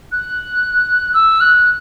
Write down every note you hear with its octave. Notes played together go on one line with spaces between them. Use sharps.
F#6
E6
F#6